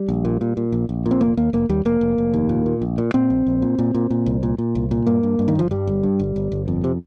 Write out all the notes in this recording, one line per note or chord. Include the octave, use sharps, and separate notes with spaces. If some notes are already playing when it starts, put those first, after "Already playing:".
Already playing: G3
A#1
A#2
A#2
A#2
A#1
A#1
A#2
C4
F1 A#3
D#2 A#3
F1 A#3
D#2 G3
F1 A#3
F1
F1
D#2
A#2
A#2
A#1
A#2
A#2 C4
A#1
A#1
A#2
A#2
A#2
A#2
C2
A#2
A#2
C2
A#2
G2 A#3
G2
G2
D#3
G1 F3
G2 G3
G1
G2
G1
G1
G1
F2
C3